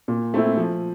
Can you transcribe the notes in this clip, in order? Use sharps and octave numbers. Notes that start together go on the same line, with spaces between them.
A#2
A3 C4 E4
F3